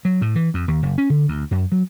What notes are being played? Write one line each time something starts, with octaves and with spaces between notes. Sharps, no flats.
F#3
A2
E3
F2
D#2
F#1
C#4
D3
D2
F#2
F#3